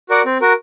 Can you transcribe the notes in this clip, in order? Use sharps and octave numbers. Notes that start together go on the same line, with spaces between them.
F#4 A#4 D5 F#5
C4
F#4 A#4